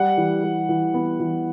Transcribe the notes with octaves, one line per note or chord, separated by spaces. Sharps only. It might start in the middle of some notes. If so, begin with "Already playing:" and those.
Already playing: G3 F#5
E3
G3
E3
B3
E3